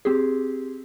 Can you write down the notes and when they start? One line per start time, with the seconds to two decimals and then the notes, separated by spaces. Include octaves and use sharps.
0.05 C4 G4 G#4